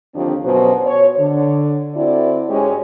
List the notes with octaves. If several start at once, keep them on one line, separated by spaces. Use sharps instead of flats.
D#2 D3 F3 C4 D4 G4
F#2 B2 C5
C#5
D3
C4 E4 F#4 A4 D5
G#2 G#3 C#4 G4 C#5